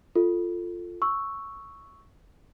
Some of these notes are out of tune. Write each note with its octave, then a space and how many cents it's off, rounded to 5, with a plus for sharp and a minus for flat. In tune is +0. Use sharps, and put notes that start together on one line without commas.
F4 +0 A4 +5
C#6 +0 E6 -5